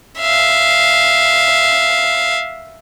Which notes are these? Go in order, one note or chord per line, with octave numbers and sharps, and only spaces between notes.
E5 F5